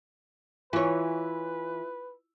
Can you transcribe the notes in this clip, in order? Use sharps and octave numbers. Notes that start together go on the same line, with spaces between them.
E3 E4 F4 B4 C#5